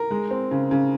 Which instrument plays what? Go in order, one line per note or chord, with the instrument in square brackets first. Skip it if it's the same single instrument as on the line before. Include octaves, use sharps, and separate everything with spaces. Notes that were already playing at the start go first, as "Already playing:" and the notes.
Already playing: [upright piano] A#4
G#3
C4
C#3
C#3